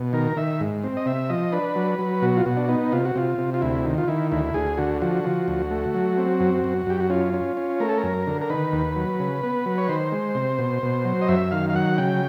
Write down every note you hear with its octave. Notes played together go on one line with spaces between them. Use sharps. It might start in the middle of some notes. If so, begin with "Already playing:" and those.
Already playing: B2
D#3 A#4
D#3 E5
G#2
C4
D#5
C3 E5
F3 D#5
D4 B4
F#3
F#3
B2 F#4
F4
B2 F#4
D4
B3 D#4
C3 F4
F#4
C3 F4
C3
F4
D2 E4
D#3
F4
D#3 E4
D2 E4
D2 G#4
D3 F#4
F3 F#4
F3
D2
A3
F#3
C4
F#2
F#2
F#2 G4
F#4
C#4 F4
C#4
C#4
A3 A#4
A4
A#4
F#2
D3
A#4
D#3 B4
D#2
F#3
C#3
B3
F#3
C#5
D#3 C5
G#3
C3
B2
B2
F#3
D#5
F#2 E5
D#3 F5
F5
F#3 F#5
C#3 G5